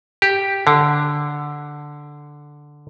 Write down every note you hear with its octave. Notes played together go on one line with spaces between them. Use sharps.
G4
D3